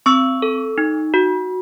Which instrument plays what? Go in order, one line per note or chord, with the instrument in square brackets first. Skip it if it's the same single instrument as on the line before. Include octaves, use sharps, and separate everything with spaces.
[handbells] C4 C#6 E6
A4
D#4
F#4